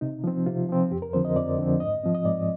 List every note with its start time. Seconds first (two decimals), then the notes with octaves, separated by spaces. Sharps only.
0.01 C3 D#4
0.24 F3 C4
0.46 C3 F4
0.69 F3 C4
0.91 F2 G4
1.02 A#4
1.13 D3 F3 C4 C5
1.25 D#5
1.36 F2 D5
1.59 D3 F3 C4
1.80 G#2 D#5
2.03 F3 C4
2.15 D#5
2.25 G#2 D5